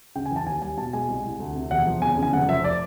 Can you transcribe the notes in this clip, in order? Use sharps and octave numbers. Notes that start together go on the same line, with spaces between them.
C#3 G5
G#5
E3 A5
D#2 G#5
G3 G#5
B2 A5
G#3 G#5
C2
C2
D2
C3
E1 F#5
F3
E2 G#5
C#3
G#5
F1 F#5
F3 E5
D5